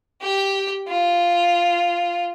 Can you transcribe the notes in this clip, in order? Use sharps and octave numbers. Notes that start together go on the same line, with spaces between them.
G4 G5
F4